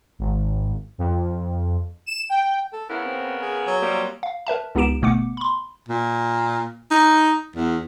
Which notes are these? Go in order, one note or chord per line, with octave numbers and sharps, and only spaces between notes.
G#1
F2
E7
G5
A4
C#3 B3 E4 A#4
C4
G#4
F#3
C3 F3 G3 A#3
F5
A#4 B4 E5 A5
C#2 B3 D#4 G4 D7 E7
G1 B2 A3 B3 D6 C#7
B5 C6
A#2
D#4
E2